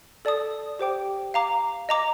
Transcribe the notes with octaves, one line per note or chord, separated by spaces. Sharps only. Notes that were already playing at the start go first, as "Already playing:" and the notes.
A4 D5 A5 D#6
G4 C5 G5 D6
F5 A#5 D6
D#5 A#5 D6